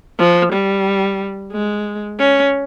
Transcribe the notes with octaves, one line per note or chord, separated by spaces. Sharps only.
F3
G3
G#3
C#4